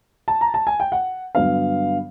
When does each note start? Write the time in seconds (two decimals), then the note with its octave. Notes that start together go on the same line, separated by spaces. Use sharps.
0.28 A5
0.41 A#5
0.54 A5
0.67 G#5
0.80 G5
0.92 F#5
1.35 G2 D3 F#3 B3 F5